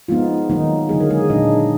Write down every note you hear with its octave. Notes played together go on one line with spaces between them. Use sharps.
F3 G#3 B3 D#4 F4
D#3 F#3 A#3 D#4
D3 F#3 A#3 G#4
A#4
G#3 G#4
A#2 F#3 D4 D#4 D#5